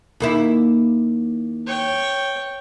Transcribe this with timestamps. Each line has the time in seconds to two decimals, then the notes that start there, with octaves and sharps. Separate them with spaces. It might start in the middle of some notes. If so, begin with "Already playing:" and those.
0.20 D#2 A#3 E4
1.67 C#5 G5